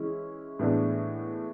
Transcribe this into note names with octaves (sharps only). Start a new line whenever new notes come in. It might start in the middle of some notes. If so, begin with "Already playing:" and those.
Already playing: E3 G#3 C#4 E4
A2 E3 G#3 B3 D4